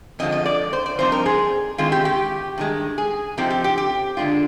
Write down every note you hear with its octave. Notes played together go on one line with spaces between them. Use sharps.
F2 D3 F3 G#3 D#5
D#5
D5
C5
D5
G2 F3 C4 D#4 C5
A#4
G#4
D#3 G#3 C4 F4
G4
G4
G2 D#3 G#3
G#4
C3 F3 C4 D#4 G4
G4
G4
G4
D3 G#3 D4 F4